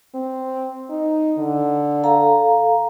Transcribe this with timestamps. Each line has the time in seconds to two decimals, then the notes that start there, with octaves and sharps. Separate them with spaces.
0.15 C4
0.90 D#4
1.38 D3
2.03 A4 F5 A#5